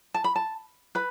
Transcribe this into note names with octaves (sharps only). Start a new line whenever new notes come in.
A5
B5
A5
B4 B5